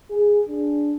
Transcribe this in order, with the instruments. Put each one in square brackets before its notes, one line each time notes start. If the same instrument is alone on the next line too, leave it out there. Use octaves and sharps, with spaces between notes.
[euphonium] G#4
D4